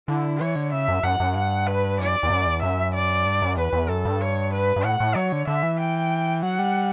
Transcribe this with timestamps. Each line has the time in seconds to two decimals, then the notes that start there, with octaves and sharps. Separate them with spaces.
0.08 D3 E4
0.40 E3 C#5
0.56 D3
0.72 C#3 E5
0.88 F#2
1.03 F#2 F#5
1.20 F#2
1.35 G2 F#5
1.67 B4
1.99 F#2 D5
2.23 E2
2.30 F#2
2.47 E2
2.62 F#2 E5
2.94 D5
3.26 G2
3.42 F#2
3.57 E2 B4
3.73 E2
3.89 F#2 A4
4.05 G2
4.20 C#5
4.53 B4
4.76 G2
4.84 A2 F#5
5.00 A2
5.15 F#3 C#5
5.32 D3
5.47 D3 E5
5.63 E3
5.79 G5
6.43 F#3 F#5
6.59 G3